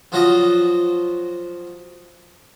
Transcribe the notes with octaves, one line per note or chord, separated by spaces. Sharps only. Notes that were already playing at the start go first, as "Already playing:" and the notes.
F3 F#3 F4 F#4 D5 D#5